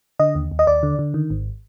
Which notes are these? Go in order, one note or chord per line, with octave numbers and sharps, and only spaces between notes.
D3 D#5
D#2
D#2
D#5
D#2 D5
D3
D3
D#3
G#1